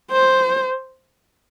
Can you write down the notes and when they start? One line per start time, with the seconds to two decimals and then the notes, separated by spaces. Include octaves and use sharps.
0.11 C5